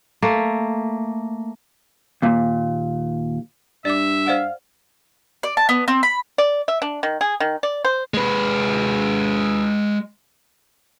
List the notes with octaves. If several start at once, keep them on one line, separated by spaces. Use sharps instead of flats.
A3 A#3
D#2 A#2
G2 D5 E5 D6
C5 D5 F5 F#5
D5
A5
B3
C4
B5
D5
E5
D4
D#3
G#4
D#3
D5
C5
G#3 B4